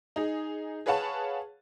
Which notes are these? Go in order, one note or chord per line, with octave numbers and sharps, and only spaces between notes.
D#4 G#4
G#4 B4 C#5 F5 F#5 A5